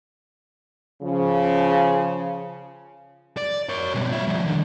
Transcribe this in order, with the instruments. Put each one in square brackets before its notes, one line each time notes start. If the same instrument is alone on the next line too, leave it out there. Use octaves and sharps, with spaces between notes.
[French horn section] C#3 F3
[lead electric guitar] D5
A#4 C#5
B2 G3
F4 E5
F3 G3
D3 D#3